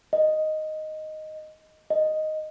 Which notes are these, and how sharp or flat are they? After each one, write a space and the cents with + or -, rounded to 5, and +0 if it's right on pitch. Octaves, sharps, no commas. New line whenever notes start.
D#5 +0
D#5 +0